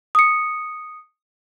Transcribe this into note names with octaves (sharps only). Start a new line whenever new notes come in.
D#6 C#7